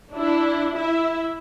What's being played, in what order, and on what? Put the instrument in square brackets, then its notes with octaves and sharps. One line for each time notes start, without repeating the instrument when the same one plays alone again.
[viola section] D4 E4
E4 E5